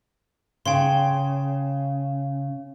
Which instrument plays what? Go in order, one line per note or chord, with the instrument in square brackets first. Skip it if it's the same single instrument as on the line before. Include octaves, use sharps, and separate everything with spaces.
[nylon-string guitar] C#3 [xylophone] G5 C6